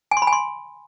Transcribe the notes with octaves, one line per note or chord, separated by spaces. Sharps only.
G#5
C6
B5
G#5
C6